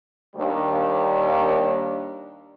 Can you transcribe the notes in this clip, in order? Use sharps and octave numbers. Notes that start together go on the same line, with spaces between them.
D#2 G3 A#3 D4